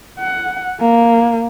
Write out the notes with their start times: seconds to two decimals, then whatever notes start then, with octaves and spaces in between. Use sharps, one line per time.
0.20 F#5
0.80 A#3